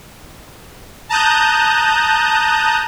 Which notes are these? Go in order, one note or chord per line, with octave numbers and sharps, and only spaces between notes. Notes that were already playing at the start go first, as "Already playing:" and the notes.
A5 A#5 D#6 F#6 G6